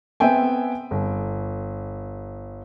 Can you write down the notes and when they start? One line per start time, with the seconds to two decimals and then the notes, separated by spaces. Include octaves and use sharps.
0.20 B3 C4 E5 G5 G#5
0.91 G1